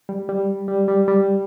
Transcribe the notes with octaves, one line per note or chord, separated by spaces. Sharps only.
G3
G3
G3
G3
G3